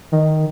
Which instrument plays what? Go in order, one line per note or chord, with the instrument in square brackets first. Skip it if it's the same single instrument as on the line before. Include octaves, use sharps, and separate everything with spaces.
[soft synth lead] D#3